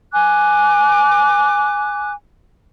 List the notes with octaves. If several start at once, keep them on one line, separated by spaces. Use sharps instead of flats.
G#5 D6 F#6